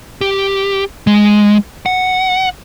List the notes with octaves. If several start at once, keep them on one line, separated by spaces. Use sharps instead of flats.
G4
G#3
F#5